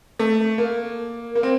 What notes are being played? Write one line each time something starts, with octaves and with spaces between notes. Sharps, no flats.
A3
A#3
A#3
C4